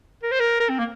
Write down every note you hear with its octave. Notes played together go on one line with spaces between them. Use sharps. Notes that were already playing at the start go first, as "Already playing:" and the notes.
A#4
C5
A#4
A#4
C4
A#3